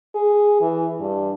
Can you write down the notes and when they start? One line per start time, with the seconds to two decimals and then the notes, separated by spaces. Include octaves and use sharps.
0.15 G#4
0.61 E3
0.99 G2